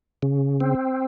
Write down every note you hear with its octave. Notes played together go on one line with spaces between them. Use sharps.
C#3
C4